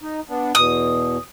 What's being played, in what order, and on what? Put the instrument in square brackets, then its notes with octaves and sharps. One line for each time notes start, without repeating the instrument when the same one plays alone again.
[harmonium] D#4
B3 D4
[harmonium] E2 B2 [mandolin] D#6